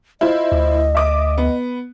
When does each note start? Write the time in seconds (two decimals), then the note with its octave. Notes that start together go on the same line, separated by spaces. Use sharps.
0.21 E4 F4 C5 D#5
0.52 D2
0.95 E5 D6 D#6
1.38 B3